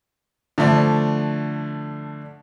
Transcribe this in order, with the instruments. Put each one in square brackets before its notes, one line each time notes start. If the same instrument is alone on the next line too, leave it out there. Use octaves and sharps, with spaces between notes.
[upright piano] D3 F3 A3 D4